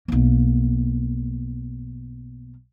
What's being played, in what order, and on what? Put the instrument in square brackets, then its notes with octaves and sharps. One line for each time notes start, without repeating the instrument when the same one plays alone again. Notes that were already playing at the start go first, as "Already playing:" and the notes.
[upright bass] B1 A#3